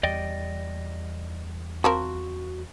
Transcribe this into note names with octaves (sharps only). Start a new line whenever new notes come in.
E2 G3 D5 D#5 G5
F3 C4 F#4 A#4